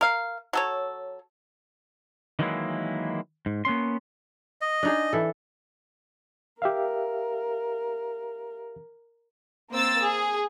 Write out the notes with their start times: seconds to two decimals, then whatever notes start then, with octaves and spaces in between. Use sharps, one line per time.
0.01 A#4 F5
0.53 F#3 A4 C#5
2.39 D#3 E3 F#3 G#3 A#3 E4
3.46 G#2
3.65 A#3 B3 C#4 C6
4.61 D#5
4.83 D4 D#4 G#4
5.13 E3 A4
6.62 G4 A#4 E5 F5
9.71 A#3 C4 C5 E6 A6
10.02 G#4